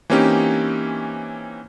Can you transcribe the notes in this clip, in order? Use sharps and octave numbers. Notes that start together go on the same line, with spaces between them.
E3 A#3 C4 C#4 D#4 G4